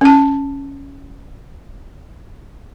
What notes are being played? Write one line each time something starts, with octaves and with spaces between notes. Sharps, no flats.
C#4 A5